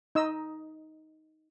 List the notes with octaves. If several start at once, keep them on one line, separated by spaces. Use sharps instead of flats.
D#4 D#5 E6